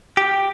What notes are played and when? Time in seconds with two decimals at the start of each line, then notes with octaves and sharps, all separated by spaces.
0.17 G4